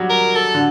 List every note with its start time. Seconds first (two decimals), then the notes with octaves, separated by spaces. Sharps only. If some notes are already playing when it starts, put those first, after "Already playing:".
Already playing: F#3 G3
0.10 A#4
0.35 A4
0.54 D3